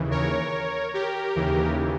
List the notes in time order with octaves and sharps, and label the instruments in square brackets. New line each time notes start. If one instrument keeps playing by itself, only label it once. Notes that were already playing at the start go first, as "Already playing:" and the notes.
Already playing: [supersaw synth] D#2 C#3 E3
A#4 C#5
G4 A#4
D#2 C#3 E3